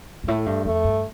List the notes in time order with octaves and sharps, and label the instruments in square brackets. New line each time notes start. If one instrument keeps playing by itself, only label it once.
[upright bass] G2
[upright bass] A2 [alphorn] A3
[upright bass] G2
[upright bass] F2 [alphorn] A3
[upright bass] G2